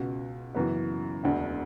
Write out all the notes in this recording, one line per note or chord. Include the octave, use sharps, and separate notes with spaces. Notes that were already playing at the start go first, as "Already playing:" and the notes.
Already playing: C#2 B2
F#1 F#2 C#3 E3 B3
E1 D2 D3